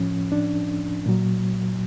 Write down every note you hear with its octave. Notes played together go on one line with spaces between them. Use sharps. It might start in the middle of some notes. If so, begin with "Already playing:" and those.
Already playing: A2 F3 C#4
D4
A#2 F#3